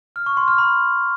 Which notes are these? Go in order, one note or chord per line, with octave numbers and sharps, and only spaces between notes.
F6
C#6
C6
F6
B5